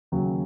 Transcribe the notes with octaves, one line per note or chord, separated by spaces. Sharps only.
D#2 C#3 F#3